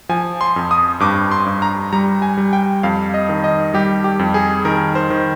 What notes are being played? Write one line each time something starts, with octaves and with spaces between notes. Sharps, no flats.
F3 G#5
C6
F2
D#6
G2 D6
C6
G2
A#5
G3 A#5
G#5
G3
G5
F2 F5
D#5
D#3
D#5
G3 G4
G4
F2
G#4
D#3 A#4
C5
D#3